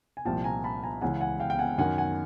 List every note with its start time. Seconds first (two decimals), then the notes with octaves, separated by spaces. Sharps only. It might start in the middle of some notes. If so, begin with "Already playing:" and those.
0.17 G#5
0.25 C2 A#2 F3 G5 A5
0.44 G#5 A#5
0.64 A5 B5
0.83 G#5 A#5
1.01 C#2 C#3 E3 F#5 G#5
1.21 F#5 G#5
1.40 F5 G5
1.50 G5
1.59 F#5 G#5
1.78 F#2 D#3 F#5 G#5
1.98 F#5 G#5